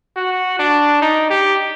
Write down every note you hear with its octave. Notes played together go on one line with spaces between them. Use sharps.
F#4
D4
D#4
G4